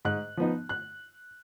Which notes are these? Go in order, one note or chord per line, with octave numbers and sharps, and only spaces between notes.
G#2 F#6
F3 B3 D#4
F#6